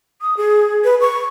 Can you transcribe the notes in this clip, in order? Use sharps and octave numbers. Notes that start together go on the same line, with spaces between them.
D#6
G#4
B4
C#6